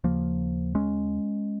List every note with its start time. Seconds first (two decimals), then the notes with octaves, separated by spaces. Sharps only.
0.04 D#2 C#3 F3 A#3
0.75 G#3 C#4